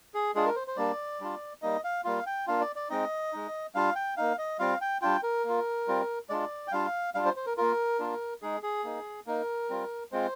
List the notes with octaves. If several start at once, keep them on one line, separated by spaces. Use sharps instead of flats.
G#4
G#3 D4 F4 G#4
A#4
C5
C5
G3 A#3 D4 D5
G3 D4 F4
G3 A#3 D#4 D#5
F5
G3 A#3 F4 F5
G5
A#3 D4 F4 F5
D5
D5
G#3 C4 D#4 D#5
G#3 D#4
G3 D4 F4 F5
G5
A#3 D#4 F5
D#5
G3 C4 F4 F5
G5
G3 D4 F4 G5
A#4
A#3 F4
G3 C4 F4
G#3 D4 F4 D5
G5
G3 D4 F4 F5
G3 D4 F4 F5
C5
C5
A#4
A#3 F4 A#4
A#3 D4 F4
G#3 D#4 G#4
G#4
A#3 D#4
A#3 D#4 A#4
G3 C4 F4
G#3 C4 F4 C5